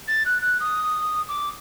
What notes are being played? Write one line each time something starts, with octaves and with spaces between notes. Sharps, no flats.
A6
F#6
F#6
D#6
D6